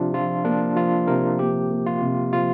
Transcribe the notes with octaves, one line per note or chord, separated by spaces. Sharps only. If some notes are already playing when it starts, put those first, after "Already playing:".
Already playing: C3 F3 D4 F4
F3 F4
A#3 D4
F3 F4
C3 A#4
A#3 G4
A#3
F4
C3
F3 F4